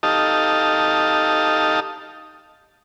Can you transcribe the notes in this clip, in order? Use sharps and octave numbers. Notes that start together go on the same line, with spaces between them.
D#4 G4 A4 D#5 F5 A5